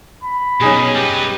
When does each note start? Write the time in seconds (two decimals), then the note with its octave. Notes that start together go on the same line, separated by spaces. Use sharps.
0.24 B5
0.61 B2 C#4 D#4 G#4
0.95 G3 G4 B4